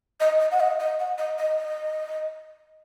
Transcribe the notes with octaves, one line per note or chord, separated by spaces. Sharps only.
D#5
D#5
F#5
D#5
D#5
F#5
D#5
D#5
D#5